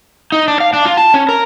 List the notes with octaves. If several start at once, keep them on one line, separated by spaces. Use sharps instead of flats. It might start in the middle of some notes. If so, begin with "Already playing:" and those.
D#4
D4
F5
D4
F4
A5
C#4
A#4